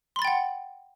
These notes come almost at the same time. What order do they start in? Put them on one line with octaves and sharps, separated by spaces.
C6 B5 A6 G5 F#5